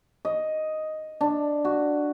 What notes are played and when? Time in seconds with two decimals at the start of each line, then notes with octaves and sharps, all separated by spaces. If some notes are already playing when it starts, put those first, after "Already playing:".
0.25 D#5
1.21 D4
1.65 F#4